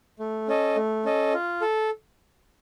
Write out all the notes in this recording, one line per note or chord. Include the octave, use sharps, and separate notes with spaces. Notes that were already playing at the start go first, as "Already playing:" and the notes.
A3
C#4 A4 D#5
A3
C#4 A4 D#5
F4
A4